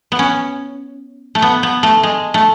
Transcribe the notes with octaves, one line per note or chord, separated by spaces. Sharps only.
B3
C#4
A3
B3
B3
A3
G#3
A3